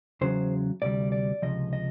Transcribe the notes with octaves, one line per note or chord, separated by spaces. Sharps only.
E2 C#3 F#3 C5
D2 C3 G3 D5
D5
C#2 C3 F3 D#5
D#5